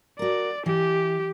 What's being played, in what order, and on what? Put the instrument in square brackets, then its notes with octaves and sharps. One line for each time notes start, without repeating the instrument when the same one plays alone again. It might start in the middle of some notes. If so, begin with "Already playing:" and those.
[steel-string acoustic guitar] F#4 A#4 [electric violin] D5
[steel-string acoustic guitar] E3 [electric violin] G4